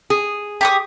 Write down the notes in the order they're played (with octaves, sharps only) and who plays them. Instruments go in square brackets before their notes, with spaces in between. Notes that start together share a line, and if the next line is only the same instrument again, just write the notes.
[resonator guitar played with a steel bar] G#4
[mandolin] G4 C#6 D#6